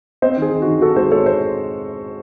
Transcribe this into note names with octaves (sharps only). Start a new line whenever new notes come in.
C4 C5 D#5
D#3 G#4
D#3
F#4
D#3
D#3 F#4 A4
G#3 G#4 C5
C4 A4 C#5
C5